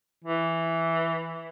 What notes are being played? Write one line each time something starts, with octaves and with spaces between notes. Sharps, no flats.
E3